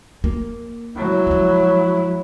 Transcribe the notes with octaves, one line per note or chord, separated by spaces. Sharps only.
A#3
F#3 E4
F3 G#3